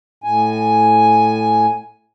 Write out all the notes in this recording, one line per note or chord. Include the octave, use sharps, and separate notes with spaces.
A2 G#5